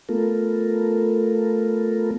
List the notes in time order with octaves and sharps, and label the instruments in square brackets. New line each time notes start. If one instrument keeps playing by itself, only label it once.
[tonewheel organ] A3 B3 F4 A4 A#4